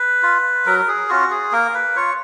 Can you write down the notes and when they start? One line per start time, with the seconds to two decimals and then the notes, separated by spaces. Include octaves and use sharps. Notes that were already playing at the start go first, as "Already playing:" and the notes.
Already playing: B4
0.23 F4
0.66 F#3 A#4
0.88 G#4
1.09 C#4 F4 F#4
1.31 G#4
1.52 A#3 A#4
1.74 B4
1.96 F4 C#5